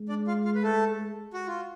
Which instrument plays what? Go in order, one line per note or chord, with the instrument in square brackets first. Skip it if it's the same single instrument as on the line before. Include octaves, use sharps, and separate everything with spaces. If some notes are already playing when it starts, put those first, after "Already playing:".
Already playing: [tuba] G#3
[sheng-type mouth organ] D4 D5
F4 F5
F4 F5
B4
A3 A4
F#4
F4